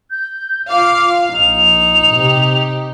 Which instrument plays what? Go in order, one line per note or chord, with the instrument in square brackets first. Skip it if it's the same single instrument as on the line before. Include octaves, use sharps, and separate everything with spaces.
[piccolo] G6
[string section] F4 F5 [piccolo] D6
[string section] A#1 [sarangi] D#4 [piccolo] F7
[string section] C3 G4